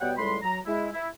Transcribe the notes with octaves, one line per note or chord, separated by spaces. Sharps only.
B2 G3 B3 C#5 F#5 G5
C#2 A2 G3 G#3 B5 C6
F#3 A#5
G#3 E4
E4